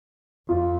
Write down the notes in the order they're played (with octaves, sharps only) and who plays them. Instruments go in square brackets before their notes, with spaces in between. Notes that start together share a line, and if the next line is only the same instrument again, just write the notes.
[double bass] F2 [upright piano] F4